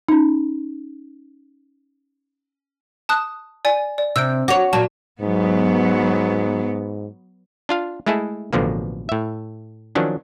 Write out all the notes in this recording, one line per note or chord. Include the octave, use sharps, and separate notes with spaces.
C#4 D#4
A5 D#6 F#6
D5 G#5
D5
C3 E6 G6 D7
F#4 C#5 D6
A#2 F#3 A5
G#2 F#3 B3
D4 F4 F5
G#3 A3 E4 G#4 A4
A1 B2 D3 F3 A#3
A2 E5
D#3 F3 F#3 C#4 D4